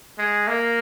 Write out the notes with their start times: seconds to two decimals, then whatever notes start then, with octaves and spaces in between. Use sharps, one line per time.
0.18 G#3
0.48 A#3